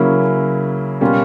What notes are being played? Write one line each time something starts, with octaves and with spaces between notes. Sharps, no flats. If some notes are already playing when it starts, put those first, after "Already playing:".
Already playing: C#3 F#3 A#3 C#4 E4
B2 G3 A#3 C#4 F4